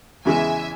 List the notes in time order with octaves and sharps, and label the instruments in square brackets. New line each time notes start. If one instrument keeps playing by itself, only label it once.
[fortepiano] E2 C#3 E3 G#3 [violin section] E5 G#5